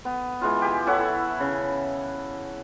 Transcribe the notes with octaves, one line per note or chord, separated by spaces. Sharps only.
B3
E3 G#3 F4
G4 G#5
E4 A4 C#5 F#5
C#3